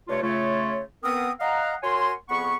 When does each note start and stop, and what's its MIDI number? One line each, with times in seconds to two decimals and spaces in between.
0.08 0.19 43
0.08 0.19 48
0.08 0.19 57
0.08 0.19 65
0.08 0.19 73
0.22 0.81 49
0.22 0.81 57
0.22 0.81 65
0.22 0.81 73
1.03 1.30 59
1.03 1.30 60
1.03 1.30 70
1.03 1.30 87
1.40 1.74 75
1.40 1.74 77
1.40 1.74 78
1.40 1.74 82
1.83 2.10 66
1.83 2.10 70
1.83 2.10 73
1.83 2.10 80
1.83 2.10 84
2.29 2.54 41
2.29 2.54 59
2.29 2.54 68
2.29 2.54 78
2.29 2.54 83
2.29 2.54 85